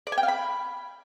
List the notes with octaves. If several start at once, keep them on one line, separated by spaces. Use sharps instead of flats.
D5
G#5
G5
F5
B5